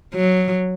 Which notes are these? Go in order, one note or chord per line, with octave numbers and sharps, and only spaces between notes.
F#3